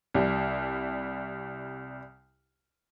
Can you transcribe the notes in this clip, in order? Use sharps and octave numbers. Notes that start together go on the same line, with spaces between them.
C2 G3